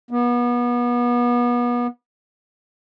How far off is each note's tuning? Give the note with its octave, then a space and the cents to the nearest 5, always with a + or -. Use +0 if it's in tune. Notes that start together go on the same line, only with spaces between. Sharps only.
B3 -30